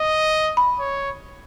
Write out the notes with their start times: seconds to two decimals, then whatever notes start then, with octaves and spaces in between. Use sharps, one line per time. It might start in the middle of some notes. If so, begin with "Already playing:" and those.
Already playing: D#5
0.57 B5
0.79 C#5